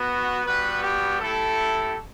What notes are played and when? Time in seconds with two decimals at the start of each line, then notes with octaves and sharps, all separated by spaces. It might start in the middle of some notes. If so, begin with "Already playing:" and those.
Already playing: B3 F#4
0.45 G3 B3 F#4 B4
0.83 G4
1.20 A3 E4 G4 A4